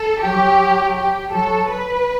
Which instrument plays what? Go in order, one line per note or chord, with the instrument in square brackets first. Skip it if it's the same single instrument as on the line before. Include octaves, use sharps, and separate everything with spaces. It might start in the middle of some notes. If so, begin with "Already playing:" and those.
Already playing: [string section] A4
[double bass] F#3 [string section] G4
[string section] G4
[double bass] F#3 [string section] A4
[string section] B4